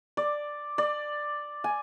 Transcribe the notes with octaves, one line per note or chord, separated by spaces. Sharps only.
D5
D5
G#5